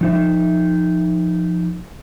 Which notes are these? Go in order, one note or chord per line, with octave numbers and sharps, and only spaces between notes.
F3 D#4 E5